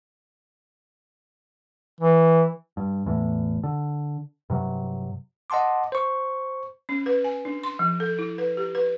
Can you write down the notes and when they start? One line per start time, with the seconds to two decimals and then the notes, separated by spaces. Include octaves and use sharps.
2.01 E3
2.77 G2
3.06 E2 A2
3.64 D3
4.50 G2 C3 F#3
5.50 D#5 F#5 A5 C6 D6
5.92 C5 C#6
6.89 C#4
7.06 B4
7.24 G#5
7.45 D4
7.63 C6
7.79 F3
8.00 A4
8.19 E4
8.38 B4
8.57 G4
8.75 B4